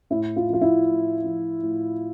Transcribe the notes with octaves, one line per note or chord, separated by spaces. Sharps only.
A2 E4
F4
F3 F4
E4
A2
F3
A2